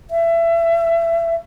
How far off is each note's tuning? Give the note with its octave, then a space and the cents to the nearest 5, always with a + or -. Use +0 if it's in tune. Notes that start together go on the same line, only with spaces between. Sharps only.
E5 +25